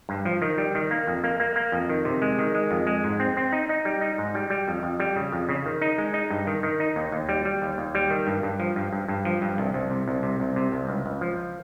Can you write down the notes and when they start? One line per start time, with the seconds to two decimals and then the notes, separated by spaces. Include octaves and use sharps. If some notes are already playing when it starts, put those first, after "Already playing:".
0.09 G2
0.25 F3
0.42 D#3
0.58 G3
0.75 D#3
0.91 A#3
1.07 F2
1.24 A#3
1.40 A#3
1.56 A#3
1.72 F2
1.89 D#3
2.05 C3
2.22 G#3
2.39 D#3
2.55 G#3
2.71 F2
2.87 G#3
3.04 G#2
3.20 C4
3.37 C4
3.52 D#4
3.69 D#4
3.85 G3
4.01 D#4
4.18 G#2
4.35 G3
4.50 G3
4.68 F2
4.83 F2
5.00 G3
5.16 C#3
5.32 F2
5.49 C#3
5.66 D#3
5.81 D#4
5.98 G#3
6.14 D#4
6.30 G2
6.47 D#3
6.63 D#3
6.80 D#4
6.96 D#2
7.12 D#2
7.29 G3
7.45 G3
7.62 D#2
7.78 D#2
7.95 G3
8.10 D#3
8.27 G2
8.43 G2
8.60 F3
8.76 G2
8.93 G2
9.08 G2
9.25 F3
9.42 G2
9.58 C2
9.74 C2
9.90 C3
10.07 C2
10.23 C3
10.40 C2
10.56 C3
10.72 C2
10.88 C#2
11.06 C#2
11.21 F3